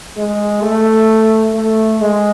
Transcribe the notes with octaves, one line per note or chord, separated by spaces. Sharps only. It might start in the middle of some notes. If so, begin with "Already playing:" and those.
G#3
A3
A3
G#3